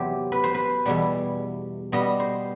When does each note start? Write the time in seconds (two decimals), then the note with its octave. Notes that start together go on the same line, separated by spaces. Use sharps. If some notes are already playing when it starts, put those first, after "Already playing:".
Already playing: E2 C3 F#3 C4 G4
0.32 B4
0.44 C5
0.54 B4
0.86 E2 B2 G3
1.92 B2 G3 B3 D#5
2.20 C5